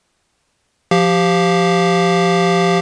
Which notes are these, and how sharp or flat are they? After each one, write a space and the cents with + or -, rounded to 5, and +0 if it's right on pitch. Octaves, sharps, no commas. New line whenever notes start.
F3 +0 G4 +0 F5 +0